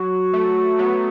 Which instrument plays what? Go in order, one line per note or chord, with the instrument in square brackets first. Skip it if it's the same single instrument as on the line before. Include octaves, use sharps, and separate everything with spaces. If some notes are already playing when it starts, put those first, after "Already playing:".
Already playing: [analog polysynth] F#3 [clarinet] F#4
[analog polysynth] A3
F#3 B3